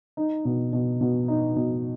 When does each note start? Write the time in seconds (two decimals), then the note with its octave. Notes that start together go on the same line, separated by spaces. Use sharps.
0.17 D#4
0.45 B2
0.73 B2
1.01 B2
1.28 D#4
1.56 B2